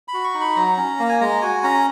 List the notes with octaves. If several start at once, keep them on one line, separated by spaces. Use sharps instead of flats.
B5
F#4
C#6
D#4
B5
F#3 A#5
C#4
A#3
G#5
G#3 A#5
F#4 G#5
C#4 A#5